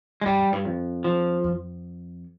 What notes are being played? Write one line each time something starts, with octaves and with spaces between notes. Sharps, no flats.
G#3
G2 G3
F2
G2
F2
F3
F2